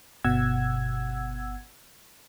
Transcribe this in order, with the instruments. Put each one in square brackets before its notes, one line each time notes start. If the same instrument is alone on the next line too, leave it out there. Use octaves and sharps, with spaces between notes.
[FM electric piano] G1 B2 F#5 E6 G#6